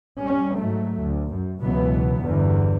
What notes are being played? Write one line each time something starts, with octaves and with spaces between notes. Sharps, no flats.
G3 C#4
G#2 F#3 A3
D2
F#2
C#2 B2 E3 F#3 B3
G1 E2 D3 E3